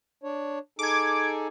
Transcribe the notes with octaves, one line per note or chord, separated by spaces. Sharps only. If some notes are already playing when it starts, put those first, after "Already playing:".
D4 C#5
D#4 G#4 A4 D6 G#6